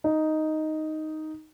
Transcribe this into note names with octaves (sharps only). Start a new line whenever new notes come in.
D#4